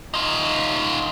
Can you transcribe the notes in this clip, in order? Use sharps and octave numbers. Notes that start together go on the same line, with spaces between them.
D#4 F4